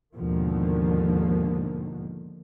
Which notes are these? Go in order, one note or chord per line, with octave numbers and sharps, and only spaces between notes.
D#2 G#2 B2 D3 D#3 F3